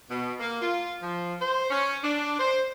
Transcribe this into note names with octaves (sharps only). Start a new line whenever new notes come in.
B2
A#3
F4
F3
C5
C#4
D4
C5